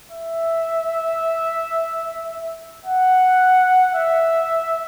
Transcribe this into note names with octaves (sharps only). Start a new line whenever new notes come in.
E5
F#5
E5